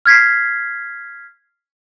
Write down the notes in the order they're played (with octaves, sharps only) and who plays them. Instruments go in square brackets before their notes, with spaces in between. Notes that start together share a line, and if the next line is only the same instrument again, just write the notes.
[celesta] F6 G#6 B6 C7